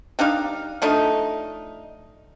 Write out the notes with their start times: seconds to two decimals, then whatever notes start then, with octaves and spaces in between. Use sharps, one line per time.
0.19 G3 D4 D#4 F5
0.82 F3 A3 D4 D#4